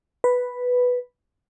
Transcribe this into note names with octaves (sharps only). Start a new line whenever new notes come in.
B4